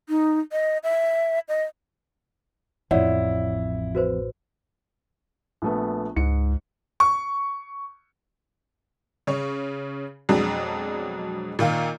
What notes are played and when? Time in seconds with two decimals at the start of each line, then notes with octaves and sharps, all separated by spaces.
0.09 D#4
0.52 D#5
0.84 E5
1.48 D#5
2.91 A1 F2 E4 C#5 D5 F#5
3.95 F#4 B4 C5
5.62 A#1 A3 B3
6.16 C#2 G#2 C#7
7.00 C#6
9.27 C#3 C#5
10.29 F2 B2 F#3 G#3 D4
11.59 A#2 D#3 F4 F5